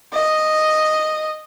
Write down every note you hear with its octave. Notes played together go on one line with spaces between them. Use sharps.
D#5